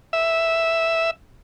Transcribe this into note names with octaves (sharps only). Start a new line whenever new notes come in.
E5